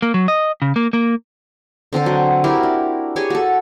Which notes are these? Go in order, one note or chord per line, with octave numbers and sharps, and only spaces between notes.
A#3
F#3
D#5
C#3
A#3
A#3
D3 C4 A4 C5
F#3
E4 F#4 G4 A#4
D4
G4 G#4 C#5 G#5
F#4 A4